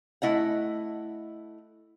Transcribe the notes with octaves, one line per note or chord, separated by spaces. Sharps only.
A3 E4 D#5 F#5